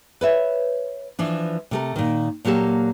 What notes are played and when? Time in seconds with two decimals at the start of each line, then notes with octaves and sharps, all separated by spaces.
0.21 B4 C#5 E5
1.19 E3 F3 D4
1.71 C3 A3 A#4
1.96 A#2 D#3
2.45 A#2 F#3 A#3 G4 A4